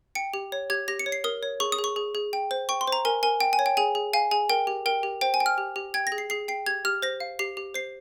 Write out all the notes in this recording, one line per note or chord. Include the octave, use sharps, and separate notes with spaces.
G5 C#7
G4
C#5
G4 G#6
G4 A#6
C#7
C#5
C7
A#4 D#6
C#5
G#4 C#6
D#6
G#4
C#6
G#4
G#4
G5
C5
G5 C#6
C6
C5
A#5
A#4 G#5
A#4 G#5
G5
G#5
C#5
G5
G#4 G#5
G#4
F5 G#5
G#4 G#5
A#4 G5
G4
A#4 G5
G4
C5 G5
G#5
G5
F6
G4
G4
G5 G#6
A#6
G#4
C7
G#4 C7
G5 C7
G4 G#6
G4 F6
C5 A#6
F5
G4 C7
G4
C5 C7